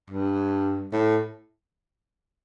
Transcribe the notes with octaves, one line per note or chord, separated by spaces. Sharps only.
G2
A2